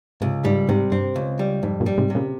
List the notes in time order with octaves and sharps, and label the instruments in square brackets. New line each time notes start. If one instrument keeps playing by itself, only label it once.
[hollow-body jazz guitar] C#2 [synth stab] G#2 C3
[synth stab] G#2 [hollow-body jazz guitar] G3
[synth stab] G#2 [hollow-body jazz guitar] C3
[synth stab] G2 [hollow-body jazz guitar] C4
[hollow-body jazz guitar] C#2
G3
[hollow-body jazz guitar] F2 [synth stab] G#2
[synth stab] G2 A#2
[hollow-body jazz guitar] G3
[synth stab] G#2 C3
[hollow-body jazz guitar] C3
[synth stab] A#2 C#3